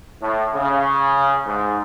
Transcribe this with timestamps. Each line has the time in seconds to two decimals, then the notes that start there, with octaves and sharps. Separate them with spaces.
0.22 A2
0.55 C#3
1.47 G#2